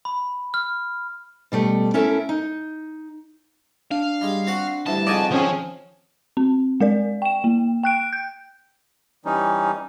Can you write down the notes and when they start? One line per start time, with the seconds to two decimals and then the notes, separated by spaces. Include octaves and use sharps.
0.05 B5
0.54 F6
1.52 B2 G3 A3
1.94 C#4 E4 A4 A#4
2.29 D#4
3.91 D4 F5
4.21 G3 G#3
4.47 C4 F#4 F#5
4.87 D2 G2 E3 A5
5.07 F2 G#2 C#3 D5 D#5 F#5 G#5
5.32 F3 C4 C#4 G#4
6.37 C4
6.80 G#3 A#4 D5
7.22 G5 E7
7.44 A#3
7.83 G5 F#6 D7
8.13 G6
9.25 E3 G3 C#4 D#4